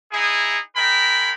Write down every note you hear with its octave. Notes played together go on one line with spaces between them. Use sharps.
D#4 E4 G#4
G#3 A#4 G5 B5